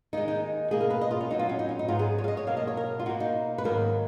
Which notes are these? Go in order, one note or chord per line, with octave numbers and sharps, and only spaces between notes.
D#2 D#3 G#3 D#4
D#4
B2 A#3 G#4
A#4
B4
D#5
F4
C#4
A#2 F#3 B3 D#4
F4
C#4
D#4
C#4
D#4
G#2 F#3 B3 F4
G#4
C#5
F5
D#5
C#5
B2 F#3 A#3 F5
D#5
C#5
A#4
F4
B2 A#3 F#4
D#4
B4
G#2 D#3 F#3 A#3 A#4